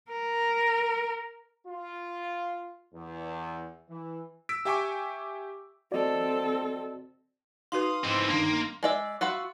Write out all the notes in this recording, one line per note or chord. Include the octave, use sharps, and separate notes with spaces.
A#4
F4
E2
E3
E6 B6 D7
G4 E5 G5 G#5 C#6 D6
C4 F#4 A4 D5 D#5
D#4 F#4 B4 F5 C6 D#6
G#2 E3 C4
G1 D#3 A#3 D4
G#3 D5 E5
F4 F#4 E5 B5